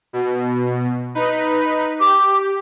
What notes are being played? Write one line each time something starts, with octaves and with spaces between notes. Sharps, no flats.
B2
D#4 B4
G4 D6